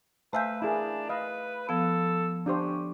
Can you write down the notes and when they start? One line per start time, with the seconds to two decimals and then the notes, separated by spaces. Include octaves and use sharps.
0.33 A3 B4 C5 E5 F5 G#5 G6
0.62 D4 E4 G#4 A#4
1.09 B4 D#5 F5
1.69 F3 B3 A4
2.46 C#4 D4 G4 C5